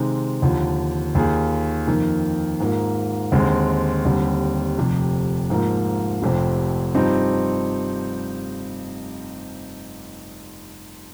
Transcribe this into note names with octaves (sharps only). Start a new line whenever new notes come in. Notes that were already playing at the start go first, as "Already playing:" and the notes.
Already playing: C3 D#3 G#3 C4 D#4
D#2 D3 F3
D#2 D#3 A#3 F4 G#4
F2 D#3 A#3
G#2 F3 A#3
D#2 D3 G#3 C4
D#2 D3 G3 C4
F1 F2 C3
G#2 F3 A#3
F1 F2 C3 F3 C4
G2 F3 C4 D#4 G4